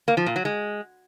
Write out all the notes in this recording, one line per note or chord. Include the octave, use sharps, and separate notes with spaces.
A#3
F3
A#2
F#3
G#3